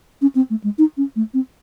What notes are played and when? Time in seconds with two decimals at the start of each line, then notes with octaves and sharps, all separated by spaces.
0.22 C#4
0.35 C4
0.50 A3
0.64 G#3
0.78 D#4
0.97 C#4
1.16 A3
1.34 C4